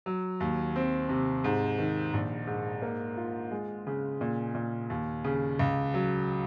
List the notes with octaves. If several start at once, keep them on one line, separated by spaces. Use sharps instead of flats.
F#3
D#2
C4
C3
G#2
D#3
A#1
G#2
A#3
F4
G#3
C#3
A#2
A#2
D#2
C#3
C#2
F#3